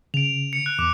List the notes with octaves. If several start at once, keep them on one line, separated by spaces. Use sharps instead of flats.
C#3 D7 F7
C#7
F#6
E2 D6